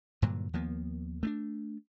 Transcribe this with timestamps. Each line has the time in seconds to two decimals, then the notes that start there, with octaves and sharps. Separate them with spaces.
0.22 G2 A#2 D3 F#3
0.53 D#2 F3 A#3 B3
1.23 A3 B3 D4